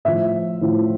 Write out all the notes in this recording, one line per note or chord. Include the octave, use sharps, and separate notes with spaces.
A2 F3 E5
A2 F3